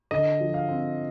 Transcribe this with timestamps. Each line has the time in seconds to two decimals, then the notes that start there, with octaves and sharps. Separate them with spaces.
0.11 D3 D#5
0.41 F3
0.54 F5
0.69 C4